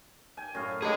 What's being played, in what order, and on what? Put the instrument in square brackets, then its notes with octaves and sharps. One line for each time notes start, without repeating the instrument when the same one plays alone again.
[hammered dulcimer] G5 G#5
F#2 A2 F5
[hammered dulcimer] D4 G4 B5 [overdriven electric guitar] G#4 D#5